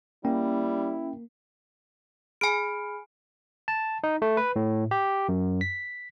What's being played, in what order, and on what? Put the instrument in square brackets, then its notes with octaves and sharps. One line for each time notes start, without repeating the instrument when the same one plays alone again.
[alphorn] G3 [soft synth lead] A#3 [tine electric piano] C#4 G5 [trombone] E4
[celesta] G#4 B5 F6 [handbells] G#5 D7
[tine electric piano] A5
D#4
A3
B4
A2
G4
F#2
B6